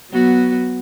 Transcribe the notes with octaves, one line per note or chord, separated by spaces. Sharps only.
F#3 B3 F#4